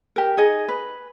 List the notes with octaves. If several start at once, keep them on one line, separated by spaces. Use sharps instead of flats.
G4 A#4
D#4 G#4 D#5
B4